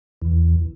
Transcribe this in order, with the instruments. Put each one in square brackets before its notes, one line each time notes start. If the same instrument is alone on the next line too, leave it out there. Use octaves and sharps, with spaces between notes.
[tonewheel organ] E2